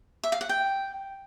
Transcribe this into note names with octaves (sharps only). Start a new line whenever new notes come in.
E5
F5
F#5
G5